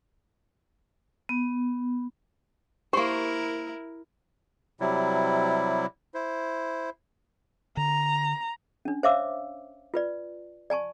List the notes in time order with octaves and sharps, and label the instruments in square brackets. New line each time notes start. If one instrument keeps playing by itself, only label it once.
[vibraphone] B3
[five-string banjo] A#3 C5 [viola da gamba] E4 A#4 [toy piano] G4 C#6
[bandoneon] C3 F#3 G3 E4
E4 C5
[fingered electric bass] D3 [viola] A#5
[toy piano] C#4 D4
C5 C#5 E5 F5 D6 E6
F4 B4 D5
D5 G#5 A5 C#6